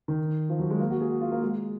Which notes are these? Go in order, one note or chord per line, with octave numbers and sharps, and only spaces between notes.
D#3
F3
F#3
G#3
A#3
F#4
G#4
F#4
F4
A#3
G#3